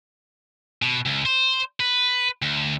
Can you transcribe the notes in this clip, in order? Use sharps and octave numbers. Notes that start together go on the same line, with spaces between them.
B2
C#2
C5
B4
D2